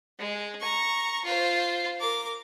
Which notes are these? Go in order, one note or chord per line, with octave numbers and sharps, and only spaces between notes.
G#3
A#5 C#6
F4 C5
A#4 D6